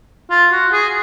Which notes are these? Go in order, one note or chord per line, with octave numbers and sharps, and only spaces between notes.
F4
F#4
G#4